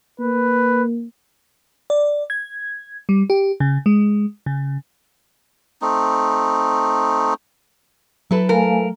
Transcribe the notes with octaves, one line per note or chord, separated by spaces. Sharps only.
A#3 B4
D5
G#6
G3
G4
C#3
G#3
C#3
A3 C4 D#4
F#3 E4 A4 B4
A3 A#4 F5 G#5